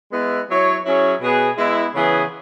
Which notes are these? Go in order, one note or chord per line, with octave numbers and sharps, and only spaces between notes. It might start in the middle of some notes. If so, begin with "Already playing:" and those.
G#3 B3 E4
F#3 E4 C#5
F#3 C#4 E4 G#4 C#5
B2 B3 G#4 B4
G#3 B3 E4
C#3 E3 B3 G#4